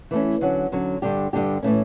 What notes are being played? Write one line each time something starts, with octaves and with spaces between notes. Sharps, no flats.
E3 A3 C#4
D3 F#3 C#4
D3 F#3 C#4
G2 D3 G3 D4 G4
G2 D3 G3 D4 G4
A2 E3 A3 C#4